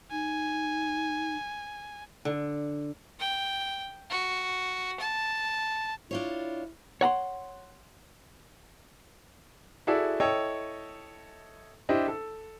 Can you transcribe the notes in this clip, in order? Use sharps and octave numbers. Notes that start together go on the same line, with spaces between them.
D#4 G#5
D3
G5
F#4
A5
D4 E4 F4 C#5
C#5 F#5 A#5 C6
E4 F#4 G#4 A4 D5 E5
E4 A4 C#5 D#5 G5
D4 E4 G4 C5 D#5
A4